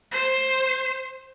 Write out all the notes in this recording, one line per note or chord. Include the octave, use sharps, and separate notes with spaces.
C5